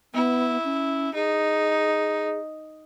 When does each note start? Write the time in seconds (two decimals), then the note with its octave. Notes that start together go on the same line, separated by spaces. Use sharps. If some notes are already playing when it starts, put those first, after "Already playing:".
0.14 B3 E4
0.65 C#4
1.15 D#4 G#4